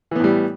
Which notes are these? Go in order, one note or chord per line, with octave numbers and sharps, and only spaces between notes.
A2 E3 G3 B3